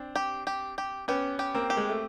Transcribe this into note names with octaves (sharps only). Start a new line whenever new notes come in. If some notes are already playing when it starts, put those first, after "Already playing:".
Already playing: C4 D4
G4
G4
G4
B3 C#4 G4
G4
A#3 C4
G4
G#3
A3